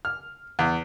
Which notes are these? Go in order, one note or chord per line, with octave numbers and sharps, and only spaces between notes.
F6
E2